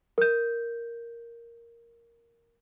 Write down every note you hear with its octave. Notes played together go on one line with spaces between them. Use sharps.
A#4 G6